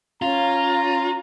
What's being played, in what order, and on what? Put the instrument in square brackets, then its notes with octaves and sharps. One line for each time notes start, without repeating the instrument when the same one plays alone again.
[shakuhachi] C#4 [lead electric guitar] F4 [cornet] A#5